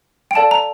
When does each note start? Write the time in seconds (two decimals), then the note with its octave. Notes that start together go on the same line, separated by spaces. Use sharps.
0.31 G5
0.35 A4 D5 F5 A5
0.51 A#5